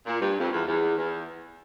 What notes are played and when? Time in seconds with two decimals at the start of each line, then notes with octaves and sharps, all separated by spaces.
0.06 A#2
0.21 G2
0.39 F2
0.51 E2
0.66 E2
0.97 E2